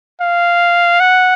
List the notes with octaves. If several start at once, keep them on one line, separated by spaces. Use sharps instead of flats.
F5
F#5